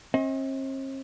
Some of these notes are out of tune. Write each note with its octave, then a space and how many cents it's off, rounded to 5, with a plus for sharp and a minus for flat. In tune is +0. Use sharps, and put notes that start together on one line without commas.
C4 +45 D#5 +40